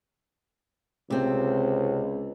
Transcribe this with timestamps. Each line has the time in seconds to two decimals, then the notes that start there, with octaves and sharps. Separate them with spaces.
1.10 C#2 C3 C4